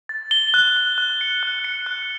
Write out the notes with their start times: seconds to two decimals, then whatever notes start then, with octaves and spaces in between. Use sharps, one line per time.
0.09 A6
0.31 G7
0.54 F#6
0.76 F#6
0.98 F#6
1.21 C#7
1.43 F#6
1.64 C#7
1.86 F#6